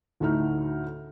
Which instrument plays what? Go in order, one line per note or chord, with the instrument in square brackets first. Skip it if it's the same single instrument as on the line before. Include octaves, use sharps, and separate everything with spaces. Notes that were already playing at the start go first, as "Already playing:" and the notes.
[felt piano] D2 A2 A3 D#4 F6